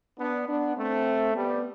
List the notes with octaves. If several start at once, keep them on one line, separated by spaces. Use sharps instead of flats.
B3 D4
B3 D4
A3 C4
G3 B3